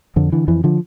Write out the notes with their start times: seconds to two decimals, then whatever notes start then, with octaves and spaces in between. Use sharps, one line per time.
0.16 F2 D3
0.32 D3 E3
0.48 F2 E3
0.64 D3 F3